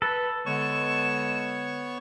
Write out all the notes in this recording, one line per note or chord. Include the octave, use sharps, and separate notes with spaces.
A4 B4 B5
D3 G#3 B3 C#5 C#6 E7